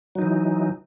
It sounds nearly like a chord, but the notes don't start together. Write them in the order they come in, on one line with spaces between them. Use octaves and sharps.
F#3 D#4 E3